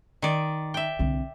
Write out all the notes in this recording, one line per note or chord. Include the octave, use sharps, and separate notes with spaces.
D#3 D5
E5 G5
C2 D3